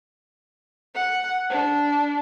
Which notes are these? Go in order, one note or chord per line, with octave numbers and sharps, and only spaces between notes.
F#5
D4